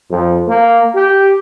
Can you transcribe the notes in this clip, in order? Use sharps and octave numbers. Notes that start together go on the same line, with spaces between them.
F2
A#3
G4